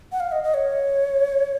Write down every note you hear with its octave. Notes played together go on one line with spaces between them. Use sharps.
F#5
F5
D#5
D#5
C#5